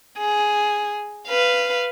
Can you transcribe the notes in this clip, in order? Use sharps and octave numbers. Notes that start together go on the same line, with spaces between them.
G#4
B4 F5